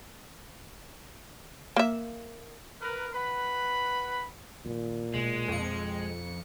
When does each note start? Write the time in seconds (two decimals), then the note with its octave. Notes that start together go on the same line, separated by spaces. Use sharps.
1.76 A#3 E5
2.82 A#4 B4
3.14 B4 F#5 B5
4.65 A#2 D#3 F3
5.14 B2 G#3 F4
5.48 F2 C#7